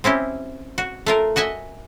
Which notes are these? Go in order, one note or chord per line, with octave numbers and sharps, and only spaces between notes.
C4 C#4 E4 G4
F#4
A3 F4 A#4
F#4 D#5 E5 G#5